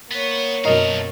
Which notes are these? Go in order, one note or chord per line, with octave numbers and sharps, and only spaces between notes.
A#3 B3 C#5
F#2 B2 F#3 A4 A#4 D#5 F5